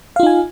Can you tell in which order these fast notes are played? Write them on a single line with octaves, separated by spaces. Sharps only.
F5 F4 D#4 G#5